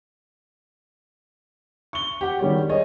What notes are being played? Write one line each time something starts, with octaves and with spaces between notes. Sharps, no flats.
C#6 G7
G4 F#5
D#3 G3 G#3 C#5
G#4 C#5 D#5